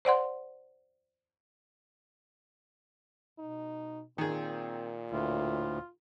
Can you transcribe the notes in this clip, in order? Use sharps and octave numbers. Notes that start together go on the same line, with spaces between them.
C5 D5 F#5 C6
B2 D#4
A#2 D#3 C4 G#4
D2 A2 F4